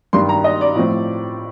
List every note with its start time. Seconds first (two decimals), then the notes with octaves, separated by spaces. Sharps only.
0.13 G2 D#3 G3 C6
0.29 A#5
0.44 D#5
0.61 D5
0.76 A2 F3 C4